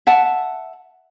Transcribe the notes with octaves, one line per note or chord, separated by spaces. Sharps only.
E5 F#5 A5